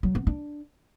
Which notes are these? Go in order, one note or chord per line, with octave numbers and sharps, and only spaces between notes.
F#3
B3
D4